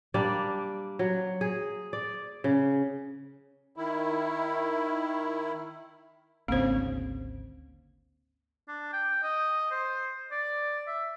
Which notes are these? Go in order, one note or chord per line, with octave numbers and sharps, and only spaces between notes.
G3 A#3 D4 D5
F#3
G#4
D5
C#3
D#3 E4
G#1 D2 C#3 A#3 C4 C5
D4
G5
D#5
C5
D5
E5